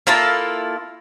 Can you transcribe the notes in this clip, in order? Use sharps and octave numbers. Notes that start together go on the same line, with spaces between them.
A#3 E4 F4 A4